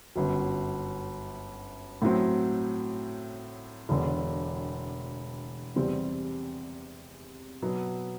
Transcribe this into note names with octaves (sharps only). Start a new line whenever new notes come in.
G1 F#2 F#3
A2 F#3 C4
E1 E2 D3
E2 C3 G3 C4
B2 F#3 B3